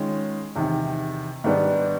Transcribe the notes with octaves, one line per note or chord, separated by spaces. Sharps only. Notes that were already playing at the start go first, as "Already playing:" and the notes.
Already playing: D#3 G#3 C#4 F4
E2 C3 D#3
G#2 D#3 G3 B3 D4